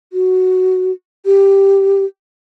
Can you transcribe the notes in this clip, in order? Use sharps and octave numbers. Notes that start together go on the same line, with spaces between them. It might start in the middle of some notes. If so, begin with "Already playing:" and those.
F#4
G4